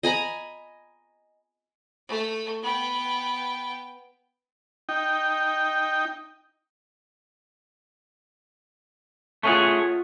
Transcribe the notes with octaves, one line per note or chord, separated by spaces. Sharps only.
D#5 G#5 A#5 B5
A3
B3 G5
D#4 G5
A3 C#4 F4 G#4 F#5 C#6